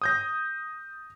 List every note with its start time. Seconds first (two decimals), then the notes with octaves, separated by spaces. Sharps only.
0.02 D#6 G6 A#6